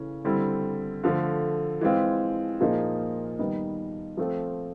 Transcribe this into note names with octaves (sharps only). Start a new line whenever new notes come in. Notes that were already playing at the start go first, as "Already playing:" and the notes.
Already playing: C#3 E3 A3 C#4
D3 G3 C4 E4
D3 F3 A3
E3 G#3 C4 F4
A#2 F3 A#3 D#4 G#4
D#3 G3 B3 D#4
F3 A3 C4 F4